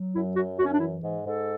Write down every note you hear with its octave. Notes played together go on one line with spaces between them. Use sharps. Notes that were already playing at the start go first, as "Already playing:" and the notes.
Already playing: F#3
F#2 E4
F#2 F#4
F#2 F#4
C#4
D4
E3 E4
G#2
G#2 A4